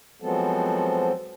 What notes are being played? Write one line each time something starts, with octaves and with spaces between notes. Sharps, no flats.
F3 F#3 G#3 B3 C4 A4